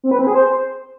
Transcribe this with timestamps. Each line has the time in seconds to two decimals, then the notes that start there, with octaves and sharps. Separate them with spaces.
0.04 C4
0.11 B4
0.19 C4
0.27 G#4
0.35 C5